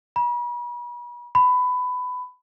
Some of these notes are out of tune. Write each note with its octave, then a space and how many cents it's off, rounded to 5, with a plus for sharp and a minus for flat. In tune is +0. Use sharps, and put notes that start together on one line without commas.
B5 -40
B5 +20